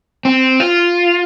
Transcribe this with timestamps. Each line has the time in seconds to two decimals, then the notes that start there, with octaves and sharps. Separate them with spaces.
0.25 C4
0.60 F4